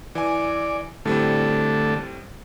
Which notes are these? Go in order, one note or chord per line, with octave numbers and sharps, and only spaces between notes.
E3 D5 G#5
A2 D3 G3 A3 C4 A4